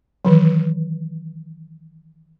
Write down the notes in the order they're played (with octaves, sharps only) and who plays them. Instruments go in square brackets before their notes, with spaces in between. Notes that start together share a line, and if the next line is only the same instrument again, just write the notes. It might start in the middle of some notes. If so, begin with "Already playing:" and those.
[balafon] D#3 E3 F#3